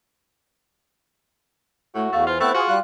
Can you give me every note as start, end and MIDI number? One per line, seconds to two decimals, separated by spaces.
1.95 2.11 45
1.95 2.07 57
1.95 2.27 66
2.13 2.40 40
2.13 2.25 57
2.13 2.24 77
2.27 2.36 65
2.27 2.60 72
2.40 2.53 57
2.40 2.51 59
2.40 2.51 60
2.40 2.53 64
2.40 2.51 90
2.55 2.79 65
2.55 2.76 66
2.55 2.66 68
2.68 2.80 55
2.68 2.78 77
2.68 2.80 90